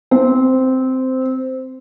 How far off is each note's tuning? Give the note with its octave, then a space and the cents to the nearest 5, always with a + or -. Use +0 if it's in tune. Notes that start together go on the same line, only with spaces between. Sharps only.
C4 -10